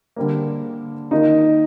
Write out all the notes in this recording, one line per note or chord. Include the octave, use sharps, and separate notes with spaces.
D3 G3 A#3
D#3 A#3 D#4 F4